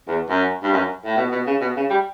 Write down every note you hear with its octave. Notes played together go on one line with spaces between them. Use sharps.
E2
F#2
G2
F#2
A2
B2
B2
C#3
B2
C#3
G3